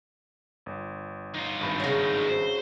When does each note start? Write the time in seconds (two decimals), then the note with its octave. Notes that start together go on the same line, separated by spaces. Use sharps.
0.66 G1
1.34 D#4 F4
1.60 G#1 G2 B5
1.80 C#3 F#3
2.28 C5